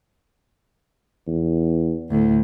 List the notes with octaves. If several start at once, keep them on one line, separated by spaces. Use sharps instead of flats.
E2
D2 A2